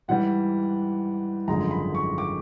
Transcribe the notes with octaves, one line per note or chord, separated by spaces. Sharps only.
G#2 E3 G3 F#5
G#1 F#2 D3 F3 G#3 A#5
B5
C#6
D6